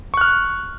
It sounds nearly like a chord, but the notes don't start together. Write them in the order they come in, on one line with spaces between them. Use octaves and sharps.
C#6 F#6 F6